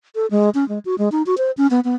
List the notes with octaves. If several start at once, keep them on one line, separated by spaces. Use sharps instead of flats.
A4
G#3
C#4
G#3
F#4
G#3
D#4
F#4
C5
C#4
B3
B3